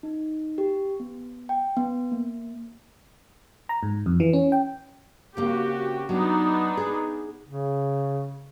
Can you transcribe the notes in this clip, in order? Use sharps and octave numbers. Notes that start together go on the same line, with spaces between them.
D#4
G4
B3
G5
B3
A#3
A#5
G#2
F2
E3
C#4
G5
C#3 A#3 C4 F#4 G4
F#3 B3 D4 D#4
G#4
C#3